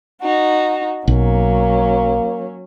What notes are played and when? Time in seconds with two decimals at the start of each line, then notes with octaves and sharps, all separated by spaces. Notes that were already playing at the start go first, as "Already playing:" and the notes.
0.22 D#4 F#4
1.08 B1 F#3 A#3 C#4